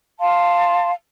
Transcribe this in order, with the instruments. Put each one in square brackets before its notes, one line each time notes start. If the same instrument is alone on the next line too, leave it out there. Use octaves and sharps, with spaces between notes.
[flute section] F5 A5 C6